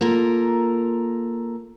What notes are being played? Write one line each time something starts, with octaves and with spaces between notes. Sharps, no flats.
A#3 F4 A4 A#4